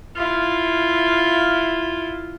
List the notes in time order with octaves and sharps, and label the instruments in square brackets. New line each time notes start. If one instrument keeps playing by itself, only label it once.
[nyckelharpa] E4 F4